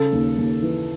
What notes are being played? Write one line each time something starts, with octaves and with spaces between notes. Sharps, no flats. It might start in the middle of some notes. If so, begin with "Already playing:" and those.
Already playing: C#3 A4
D#2
D#2
E3